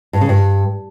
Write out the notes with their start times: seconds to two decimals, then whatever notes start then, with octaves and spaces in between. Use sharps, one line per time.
0.13 G2
0.21 C#3
0.29 G2